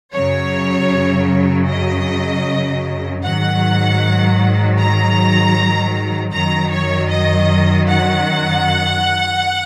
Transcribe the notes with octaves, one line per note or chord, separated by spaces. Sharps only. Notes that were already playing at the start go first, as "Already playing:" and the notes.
F#2 C#3 F#3 C#5
D#5
G#2 D#3 F#3 F#5
A#5
F#2 D#3 F#3 A#5
C#5
D#5
F#5